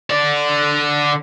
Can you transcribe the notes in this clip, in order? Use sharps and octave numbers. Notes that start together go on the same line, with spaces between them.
D3 D5